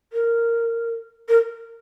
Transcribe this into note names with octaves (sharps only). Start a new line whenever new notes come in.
A#4
A#4